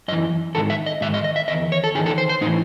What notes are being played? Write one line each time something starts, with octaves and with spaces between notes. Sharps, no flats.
F#2 E3 D#5
G#2 D#3 A4
E5
D#5
G#2 D#3 E5
D#5
D#5
E5
E2 D#3 D#5
C#5
A4
E2 D#3 G#4
A4
C5
C5
A2 E3 D#4